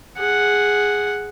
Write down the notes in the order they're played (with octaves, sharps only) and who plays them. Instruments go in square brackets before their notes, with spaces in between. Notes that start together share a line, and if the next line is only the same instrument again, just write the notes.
[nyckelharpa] G#4 F#5